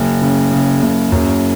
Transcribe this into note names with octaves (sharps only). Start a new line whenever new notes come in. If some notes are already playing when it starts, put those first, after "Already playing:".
Already playing: F#1
C#3
C#3
F#1
F#2